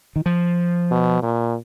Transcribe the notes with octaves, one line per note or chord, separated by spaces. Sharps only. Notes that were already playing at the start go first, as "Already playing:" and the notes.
D#3
F3
B2
A#2